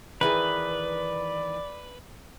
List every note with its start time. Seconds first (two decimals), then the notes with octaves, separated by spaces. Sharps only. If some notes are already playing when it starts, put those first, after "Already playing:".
0.21 D#3 E3 G#4 B4 D5